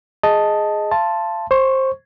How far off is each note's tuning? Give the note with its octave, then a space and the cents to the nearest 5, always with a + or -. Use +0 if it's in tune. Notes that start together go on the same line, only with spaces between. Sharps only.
G#4 +5 D#5 +5 A5 +0
F5 -35 A5 +0 C6 +0
C5 +15 C#6 +0